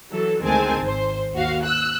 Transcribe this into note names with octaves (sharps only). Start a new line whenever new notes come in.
E3 F#3 A4
D2 D#3 G#3 C4 G#5 A5
G#1 C5
D#2 F#4 F5
E6 F#6